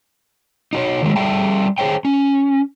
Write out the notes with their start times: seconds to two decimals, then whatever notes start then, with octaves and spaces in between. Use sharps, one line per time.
0.73 D#4 F#4 C#5
1.03 D#3 F#3 G#3
1.16 G3 A4 E5 G5 A5
1.78 G#4 C5 C#5 G5
2.05 C#4